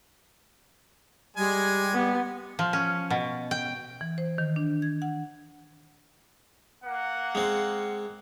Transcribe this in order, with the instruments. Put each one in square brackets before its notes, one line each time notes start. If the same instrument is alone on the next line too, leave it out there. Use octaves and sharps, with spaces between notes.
[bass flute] G3 [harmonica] G#3 G#5
[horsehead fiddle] B3
[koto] F3
C#4
B2
G5
[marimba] E3
C5
D#3
D4
G#6
F#5
[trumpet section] A#3 F#5
[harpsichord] G#3 C4